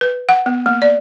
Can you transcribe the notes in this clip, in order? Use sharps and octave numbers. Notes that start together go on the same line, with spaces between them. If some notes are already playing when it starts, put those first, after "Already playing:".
B4
F#5
B3
A#3
D5